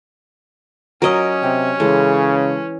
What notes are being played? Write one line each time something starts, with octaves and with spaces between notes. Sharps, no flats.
F#3 C#4 A#4 C#5 D#5 D#6
C3 G4
C#3 E3 G#3 A4